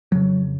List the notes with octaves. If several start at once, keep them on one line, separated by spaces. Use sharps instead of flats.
F2 C#3 F#3